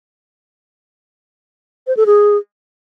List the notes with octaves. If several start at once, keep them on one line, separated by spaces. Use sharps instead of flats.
C5
A4
G#4